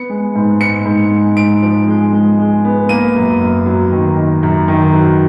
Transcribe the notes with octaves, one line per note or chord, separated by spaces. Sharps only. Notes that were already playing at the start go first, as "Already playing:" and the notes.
Already playing: B3 C#7
G#3
G#2
G#2 C#7
G#2
G#3
G#2 D7
F3
G#3
G#3
G#3
B3
A#3 D#7
F#2
F#2
F#3
D#3
D#3
F#2
D#3
F#3